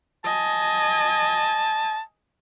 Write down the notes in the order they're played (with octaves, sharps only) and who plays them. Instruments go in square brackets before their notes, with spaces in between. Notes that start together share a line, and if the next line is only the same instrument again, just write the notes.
[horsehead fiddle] D#5 G#5 [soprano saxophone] A5